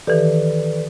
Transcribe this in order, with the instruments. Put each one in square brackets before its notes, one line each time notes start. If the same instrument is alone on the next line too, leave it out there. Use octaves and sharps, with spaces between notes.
[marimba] D#3 E3 G4 [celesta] A4 B4 D5